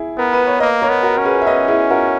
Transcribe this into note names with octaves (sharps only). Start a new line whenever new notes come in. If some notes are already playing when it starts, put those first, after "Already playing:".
Already playing: E4 G#4
B3 A#4
B4
C#5
A#3 B4 D#5
A#4 C#5
B3
F#4 A#4
C#4 A#4
G#4 B4
E5
B4 D#5
E4 G#4
F#4 A#4